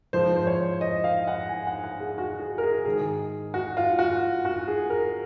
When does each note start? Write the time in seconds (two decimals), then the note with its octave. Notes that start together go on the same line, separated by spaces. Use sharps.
0.13 G#2 F3 C5
0.36 C5
0.47 C#5
0.81 D#5
1.04 F5
1.27 F#5
1.49 G#5
1.67 F#5
1.84 F#5
2.00 G#4
2.18 F#4
2.40 G#4
2.58 A#4
2.63 G#4
2.85 G#2 D#3 G#4
3.54 F#4
3.77 F4
3.99 F#4
4.45 F#4
4.68 G#4
4.90 A#4